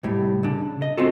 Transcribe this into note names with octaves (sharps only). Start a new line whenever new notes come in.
C2 A2 G3
C#3 D4
D#5
C4 C#4 F4 F#4 A4